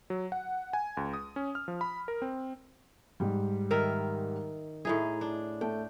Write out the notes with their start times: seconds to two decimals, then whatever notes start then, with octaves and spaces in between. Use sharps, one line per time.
0.10 F#3
0.32 F#5
0.73 G#5
0.97 C#2
1.13 D#6
1.36 C#4
1.55 F6
1.68 F3
1.81 B5
2.08 A#4
2.22 C4
3.20 G#2 G3
3.71 D#3 A#4 E5
4.85 A2 D#4 E4 G#4
5.21 D4
5.61 A3 G5